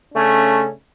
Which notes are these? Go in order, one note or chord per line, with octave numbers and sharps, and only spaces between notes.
C#3 A3 C#4 D4